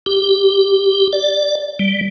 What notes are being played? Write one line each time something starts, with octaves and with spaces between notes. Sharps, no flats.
G4
D5
G3